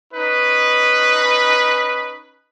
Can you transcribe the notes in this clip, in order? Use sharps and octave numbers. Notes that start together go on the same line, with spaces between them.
C#4 D#4 B4